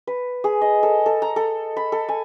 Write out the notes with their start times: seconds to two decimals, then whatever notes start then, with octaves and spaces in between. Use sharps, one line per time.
0.07 B4
0.44 G#4
0.61 D#5
0.83 A4
1.06 A4
1.22 A#5
1.36 A4
1.77 B5
1.92 A4
2.09 G#5